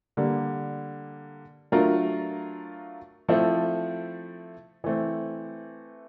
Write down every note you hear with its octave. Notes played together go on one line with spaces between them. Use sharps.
D3 G3 A#3
F#3 A3 D4 F4 A#4
F3 A3 C4 E4 A4
E3 A3 C4